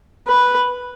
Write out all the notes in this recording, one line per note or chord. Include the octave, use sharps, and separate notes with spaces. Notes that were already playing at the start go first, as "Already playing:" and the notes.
B4